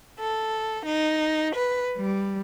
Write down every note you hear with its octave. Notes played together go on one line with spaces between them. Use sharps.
A4
D#4
B4
G3